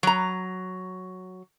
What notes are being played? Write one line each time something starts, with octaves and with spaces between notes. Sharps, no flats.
F#3 A#5